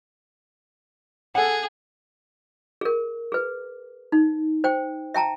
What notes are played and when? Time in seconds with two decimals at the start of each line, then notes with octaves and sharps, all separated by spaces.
1.35 G#4 A4 F#5
2.81 G#4 A#4
3.32 G#4 B4
4.12 D#4
4.64 C5 G5
5.14 E5 G5 A5 A#5